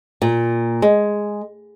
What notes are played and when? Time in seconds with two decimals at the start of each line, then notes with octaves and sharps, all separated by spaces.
0.22 A#2
0.82 G#3